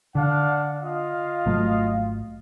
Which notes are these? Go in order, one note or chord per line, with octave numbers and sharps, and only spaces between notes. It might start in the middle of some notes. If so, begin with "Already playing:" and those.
D3 D4 F5 F#5
F4 D#5 F5
G#1 F#3 A3